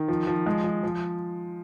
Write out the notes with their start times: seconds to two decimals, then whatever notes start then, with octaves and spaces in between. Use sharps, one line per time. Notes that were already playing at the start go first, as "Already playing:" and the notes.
Already playing: D#3
0.08 F3
0.27 F3
0.46 G#3
0.64 F3
0.83 F3